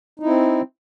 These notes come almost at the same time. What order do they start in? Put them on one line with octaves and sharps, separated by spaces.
D#4 E4 C4